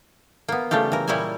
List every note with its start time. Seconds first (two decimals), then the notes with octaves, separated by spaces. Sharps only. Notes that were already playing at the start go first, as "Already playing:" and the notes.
0.48 A#3 B3
0.71 C#3 G3 A3 F4 G4
0.92 E3 A#4
1.08 A#2 G3 E4 C#5 D#5 G#5